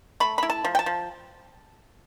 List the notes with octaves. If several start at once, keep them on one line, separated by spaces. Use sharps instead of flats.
A3 B5
E4 B5
A5
F3
G5
A5
F3